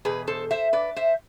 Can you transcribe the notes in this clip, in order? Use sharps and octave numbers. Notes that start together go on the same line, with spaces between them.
E2 B2 G#4 B4
A4 C5
C5 E5
B4 D5
C5 E5